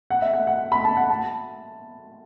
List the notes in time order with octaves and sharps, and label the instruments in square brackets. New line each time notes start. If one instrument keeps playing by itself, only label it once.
[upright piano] F#5
E5
F#5
F#5
B5
A5
F#5
A5